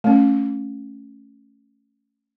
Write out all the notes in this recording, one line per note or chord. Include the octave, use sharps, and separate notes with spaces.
A3 C#4